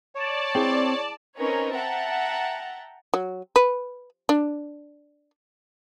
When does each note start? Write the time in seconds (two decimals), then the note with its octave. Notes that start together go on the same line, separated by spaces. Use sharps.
0.15 C#5 D5 A5
0.55 C4 E4 G#4 G5
1.38 C4 C#4 D#4 A#4 B4 C#5
1.74 E5 F#5 G5 A5 A#5
3.14 F#3
3.56 B4
4.29 D4